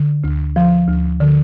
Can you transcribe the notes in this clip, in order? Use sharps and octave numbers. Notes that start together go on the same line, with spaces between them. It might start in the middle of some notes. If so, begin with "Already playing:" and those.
Already playing: D3
D2
F3
D2
D3